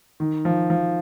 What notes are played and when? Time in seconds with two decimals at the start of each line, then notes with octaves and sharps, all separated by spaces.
0.20 D#3
0.45 F3
0.70 F3